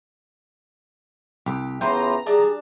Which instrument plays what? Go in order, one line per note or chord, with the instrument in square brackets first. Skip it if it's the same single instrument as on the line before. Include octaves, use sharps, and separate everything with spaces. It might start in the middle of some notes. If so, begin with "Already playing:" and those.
[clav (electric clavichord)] C2 [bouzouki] G4
[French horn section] A2 C#3 B3 [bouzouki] E3 F4 C5 [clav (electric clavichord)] G5 [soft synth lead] A#5
[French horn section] G3 G4 G#4 [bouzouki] D4 A5